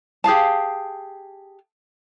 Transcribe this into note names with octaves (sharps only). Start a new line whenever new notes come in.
G4 G#4 F5 A5